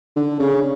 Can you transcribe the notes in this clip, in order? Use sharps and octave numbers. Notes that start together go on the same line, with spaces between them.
D3
C#3